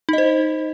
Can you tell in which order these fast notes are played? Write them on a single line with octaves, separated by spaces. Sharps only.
D#4 D#5 C5